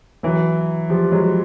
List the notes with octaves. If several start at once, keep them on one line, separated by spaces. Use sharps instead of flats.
E3 F#3
F3 G3
F#3 G#3